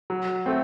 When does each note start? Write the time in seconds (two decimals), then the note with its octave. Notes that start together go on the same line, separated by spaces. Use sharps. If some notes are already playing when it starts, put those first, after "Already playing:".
0.10 F#3
0.46 A3 C4